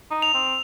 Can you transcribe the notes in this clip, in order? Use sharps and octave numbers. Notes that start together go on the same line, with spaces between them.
D#4
F7
C4